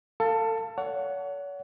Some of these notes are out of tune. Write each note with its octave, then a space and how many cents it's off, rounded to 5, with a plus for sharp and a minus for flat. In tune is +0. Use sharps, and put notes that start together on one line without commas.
A4 +30 F5 -5 A5 +15
C#5 +40 F#5 +0